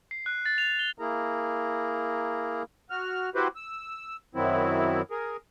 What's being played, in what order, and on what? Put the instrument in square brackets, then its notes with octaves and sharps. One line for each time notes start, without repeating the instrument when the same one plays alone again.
[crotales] C7
F#6
A6
F7
G7
[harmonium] A#3 E4 G#4 A#4 A#5
[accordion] F#4 F6
E4 F#4 G4 B4 C5
E6
F#2 D#3 F#3 C4 E4
G#4 A#4